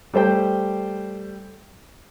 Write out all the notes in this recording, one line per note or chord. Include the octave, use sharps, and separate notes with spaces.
G3 A3 C5 G5